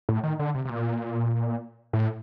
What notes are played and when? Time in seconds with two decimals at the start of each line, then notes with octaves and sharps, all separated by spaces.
0.09 A2
0.24 D#3
0.39 D3
0.55 C3
0.65 C3
0.70 A#2
1.93 A2